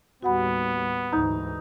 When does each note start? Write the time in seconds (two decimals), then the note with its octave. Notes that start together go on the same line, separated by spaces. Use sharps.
0.23 D#2 A2 G3 B3 F#4 F#5 B5
1.12 D2 G#2 E3 D#4